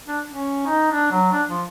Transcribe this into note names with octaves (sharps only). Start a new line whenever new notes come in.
D4
C#4
D#4
D4
F#3
D4
F3